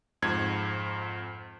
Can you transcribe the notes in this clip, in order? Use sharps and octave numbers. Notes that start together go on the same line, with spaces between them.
F2 G#2 G#6